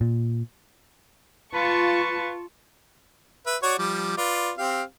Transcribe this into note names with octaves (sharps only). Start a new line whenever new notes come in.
A#2
F4 B4 A5 C#6
B4 E5
F#4 C#5 D5
F3 G3 D6
F4 B4 D5
C4 G4 F5